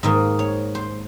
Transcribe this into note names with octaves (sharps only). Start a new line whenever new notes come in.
G#2 D#3 A#3 D#5
C#5
C5